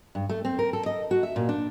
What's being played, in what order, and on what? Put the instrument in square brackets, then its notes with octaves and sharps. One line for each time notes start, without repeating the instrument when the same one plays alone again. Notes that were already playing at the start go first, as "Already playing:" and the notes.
[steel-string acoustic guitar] G2
A3
C4
A#4
A4
D#5
F#4
E5
A#2
D4